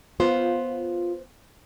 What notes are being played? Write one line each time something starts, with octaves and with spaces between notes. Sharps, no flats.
B3 F4 C5